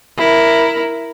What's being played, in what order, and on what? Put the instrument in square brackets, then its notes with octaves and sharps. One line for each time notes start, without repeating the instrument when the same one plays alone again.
[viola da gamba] E4 A#4